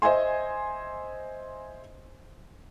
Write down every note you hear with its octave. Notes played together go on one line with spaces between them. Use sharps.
C5 D#5 E5 G#5 C6